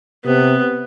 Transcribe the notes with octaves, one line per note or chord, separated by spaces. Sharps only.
C3 B3